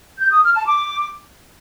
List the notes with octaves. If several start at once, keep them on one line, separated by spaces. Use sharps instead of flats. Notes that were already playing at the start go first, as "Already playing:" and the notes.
G6
D#6
F6
A5
D6